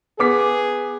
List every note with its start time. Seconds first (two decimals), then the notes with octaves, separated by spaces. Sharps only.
0.19 B3 G#4 D6 B6